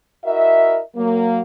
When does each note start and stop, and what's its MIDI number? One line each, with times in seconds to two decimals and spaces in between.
0.25 0.79 64
0.25 0.79 66
0.25 0.79 70
0.25 0.79 75
0.25 0.79 76
0.96 1.42 54
0.96 1.42 58